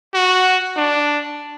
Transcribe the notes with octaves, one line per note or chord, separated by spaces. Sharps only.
F#4
D4